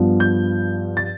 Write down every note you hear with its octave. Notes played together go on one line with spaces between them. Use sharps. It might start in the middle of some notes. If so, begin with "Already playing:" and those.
Already playing: G2 F3 B3
G6
A6